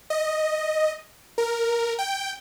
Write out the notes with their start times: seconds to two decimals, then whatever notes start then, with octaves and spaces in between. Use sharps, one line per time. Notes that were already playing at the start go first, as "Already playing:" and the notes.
0.10 D#5
1.38 A#4
1.99 G5